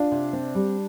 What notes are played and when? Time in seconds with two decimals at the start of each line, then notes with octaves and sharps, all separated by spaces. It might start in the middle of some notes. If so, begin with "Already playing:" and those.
Already playing: D4 F4
0.11 C3
0.33 C4
0.55 G3